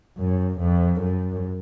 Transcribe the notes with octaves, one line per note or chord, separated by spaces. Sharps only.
F#2
F2
F#2